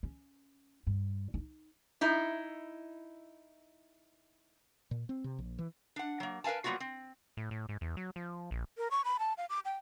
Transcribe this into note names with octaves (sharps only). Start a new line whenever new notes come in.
C#4
G2
D4 D#4
D#4 E4
A#2
C4
C3
A#1
E3
D4 F#5
F#3 A#3
A#4 B4 F5 G#5 A5
F#3 G3 A#3 B3 F4 F#4
C4
A2
A2
G#2
E2
F#3
F3
A#1
A#4
C#6
B5
A5
F5
D6
G5